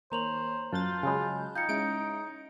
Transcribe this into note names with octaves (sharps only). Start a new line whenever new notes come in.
D#3 A#3 C5 C#5 A#5 F7 F#7
F#2 F4 A5 F#6 G6 A6
C#3 F#3 G#3 G#5 B5
D#4 F4 F5 G5 G6 G#6 C#7
G#3 C#4 E4 D7